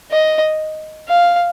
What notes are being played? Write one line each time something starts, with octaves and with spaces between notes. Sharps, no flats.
D#5
F5